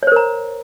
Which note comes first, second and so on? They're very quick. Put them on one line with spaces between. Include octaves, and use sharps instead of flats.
C#5 C5 A#4 A#5